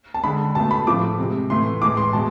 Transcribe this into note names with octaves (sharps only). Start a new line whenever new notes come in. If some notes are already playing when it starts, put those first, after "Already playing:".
A5
D3 G#3 B5
B2 A3 A5
B5
A2 F3 A3 D6
C3 G#3
A2 E3 A3 C6
A2 E3 G#3 D6
C6
B2 G#3 A5